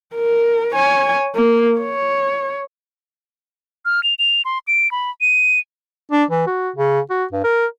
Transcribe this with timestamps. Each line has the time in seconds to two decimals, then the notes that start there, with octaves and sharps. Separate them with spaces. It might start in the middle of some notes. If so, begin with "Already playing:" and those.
0.15 A#4
0.75 C#5 G#5
1.35 A#3
1.80 C#5
3.85 F6
4.03 F7
4.19 F7
4.45 C6
4.68 D7
4.92 B5
5.21 D#7
6.12 D4
6.31 E3
6.47 F#4
6.76 C#3
7.10 F#4
7.33 G2
7.44 A#4